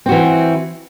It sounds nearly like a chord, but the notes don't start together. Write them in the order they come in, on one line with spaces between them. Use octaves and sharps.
C4 F#4 E3